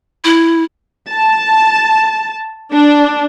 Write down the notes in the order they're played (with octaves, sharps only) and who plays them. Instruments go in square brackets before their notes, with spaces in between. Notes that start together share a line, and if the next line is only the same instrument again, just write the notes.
[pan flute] E4
[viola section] A5
D4